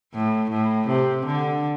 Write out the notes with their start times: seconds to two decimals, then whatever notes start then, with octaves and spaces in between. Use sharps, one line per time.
0.14 A2
0.51 A2
0.88 C3
1.26 D3